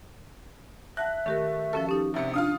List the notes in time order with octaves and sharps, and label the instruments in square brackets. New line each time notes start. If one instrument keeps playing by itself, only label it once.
[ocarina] E5 [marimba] F#5 A5 A#6 [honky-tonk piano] F#6
[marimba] D#3 G4 A#4 [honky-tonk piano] A3
[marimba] F3 C#4 F#4 [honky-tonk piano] A4
[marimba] C#4 D#4 [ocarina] G4
[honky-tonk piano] G#1 C3 C#7 [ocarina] E5
[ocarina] D4 [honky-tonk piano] F4 F5 D#6